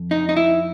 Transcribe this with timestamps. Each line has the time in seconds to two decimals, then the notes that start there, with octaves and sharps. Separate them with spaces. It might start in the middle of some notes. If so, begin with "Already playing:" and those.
Already playing: F2
0.11 D#4
0.29 D#4
0.37 E4